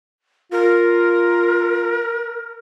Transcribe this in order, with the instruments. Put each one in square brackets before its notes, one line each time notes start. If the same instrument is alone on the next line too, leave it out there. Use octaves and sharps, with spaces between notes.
[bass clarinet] F4 [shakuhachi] A#4